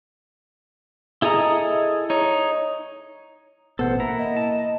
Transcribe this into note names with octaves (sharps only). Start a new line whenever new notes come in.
E4 G#4 A4 D#5 A#5
D#4 C#5
A1 B2 B3 A4 C5 F#5
A#3 E4 A#5
D#5
A5